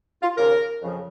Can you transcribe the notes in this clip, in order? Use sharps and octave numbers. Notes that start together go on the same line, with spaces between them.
F4
D#2 C#3 F3 A#3 A#4
F2 C#3 F3